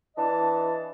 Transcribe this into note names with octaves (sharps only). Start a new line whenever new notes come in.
E3 D4 D#5 A5